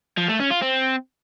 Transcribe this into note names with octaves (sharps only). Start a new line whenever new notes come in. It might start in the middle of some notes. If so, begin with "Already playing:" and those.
F3
A3
C#4
F4
C4